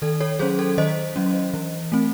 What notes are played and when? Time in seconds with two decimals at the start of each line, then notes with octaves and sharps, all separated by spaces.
0.02 D#3 A4
0.20 A4 C#5
0.39 F#3 C#4 G#4 C5
0.59 A4
0.78 D#3 C5 D#5
1.16 F#3 C#4
1.54 E3
1.92 A3 C4